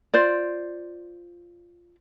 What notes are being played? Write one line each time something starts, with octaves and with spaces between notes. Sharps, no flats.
F4 C5 D5